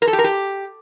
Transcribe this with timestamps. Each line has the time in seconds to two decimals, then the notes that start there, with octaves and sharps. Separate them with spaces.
0.02 A#4
0.07 A4
0.13 G4
0.19 A#4
0.24 G4